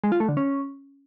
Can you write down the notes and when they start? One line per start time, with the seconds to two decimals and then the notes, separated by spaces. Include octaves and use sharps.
0.04 G#3
0.12 F4
0.20 A3
0.29 D3
0.37 C#4